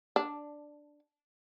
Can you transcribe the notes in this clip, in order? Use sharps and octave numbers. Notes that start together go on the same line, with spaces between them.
D4